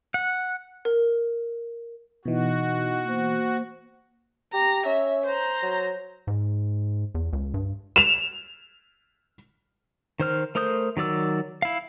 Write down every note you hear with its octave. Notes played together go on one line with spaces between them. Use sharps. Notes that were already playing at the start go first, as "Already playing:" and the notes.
F#5
A#4
B2 E3 D#4 F#4 D#5
A#3 C5
G4 A#5
C#4 E5
C5 A#5
F#3
G#2
E2
C#2
G2
E7 F7
D#3 C5 F6
A3 A#4 C5 D#6 G6
D#3 F#3 D5 E6
E4 F5